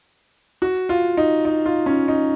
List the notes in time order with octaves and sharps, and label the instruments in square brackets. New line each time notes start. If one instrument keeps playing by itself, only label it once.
[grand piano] F#4
F4
D#4
D#4
F4
C#4
D#4